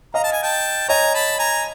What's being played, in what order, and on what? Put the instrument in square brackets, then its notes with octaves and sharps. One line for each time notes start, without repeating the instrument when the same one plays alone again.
[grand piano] D#5 F5 [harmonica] A#5
[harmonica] A5
G#5
G5 A5
[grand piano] C#5 D#5 [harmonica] G#5 A#5
[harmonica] A5 B5
G#5 A#5